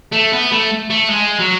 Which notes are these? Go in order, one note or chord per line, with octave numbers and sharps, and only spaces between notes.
A3
B3
A3
A3
G#3
F#3